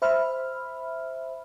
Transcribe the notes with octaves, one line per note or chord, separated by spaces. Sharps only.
C5 E5 B5 F6